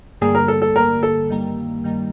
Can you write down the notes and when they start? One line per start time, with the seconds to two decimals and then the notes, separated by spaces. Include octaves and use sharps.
0.21 A1 G2 D3 G3 A#3 G#4
0.35 A#4
0.48 A4
0.62 A4
0.75 A1 G2 D3 G3 A#3 A#4
1.03 A4
1.30 G2 D#3 G3 A#3
1.84 G2 D#3 G3 A#3